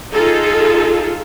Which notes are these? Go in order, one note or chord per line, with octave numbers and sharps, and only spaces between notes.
D#4 F4 G#4 A4